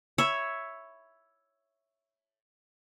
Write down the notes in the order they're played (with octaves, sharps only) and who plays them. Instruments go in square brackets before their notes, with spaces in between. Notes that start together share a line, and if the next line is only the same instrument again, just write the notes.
[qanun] C#5 E5 B5